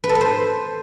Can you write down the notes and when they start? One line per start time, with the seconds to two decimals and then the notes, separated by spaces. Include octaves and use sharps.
0.04 B4
0.09 A4
0.15 B4
0.21 C5